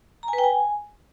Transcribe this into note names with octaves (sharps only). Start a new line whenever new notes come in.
A#5
G#5
B4
G5
G#5